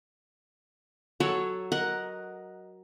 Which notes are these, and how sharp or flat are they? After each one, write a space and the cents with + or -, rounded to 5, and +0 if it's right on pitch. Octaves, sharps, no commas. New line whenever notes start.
F#3 +5 A4 +0 C#5 +0
A#4 +10 D#5 +0 F#5 +0